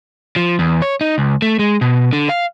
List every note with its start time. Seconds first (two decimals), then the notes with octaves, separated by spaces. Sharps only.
0.36 F3
0.59 E2
0.82 C#5
1.01 D#4
1.18 C#2
1.42 A3
1.59 G#3
1.81 B2
2.13 D3
2.29 F5